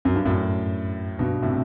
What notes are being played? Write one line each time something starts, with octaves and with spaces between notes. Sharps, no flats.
F#2
G2
F#2 A2
G2 B2
A2 C3